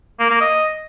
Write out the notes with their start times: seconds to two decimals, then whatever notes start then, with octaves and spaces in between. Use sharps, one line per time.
0.20 A#3
0.30 A#3
0.41 D#5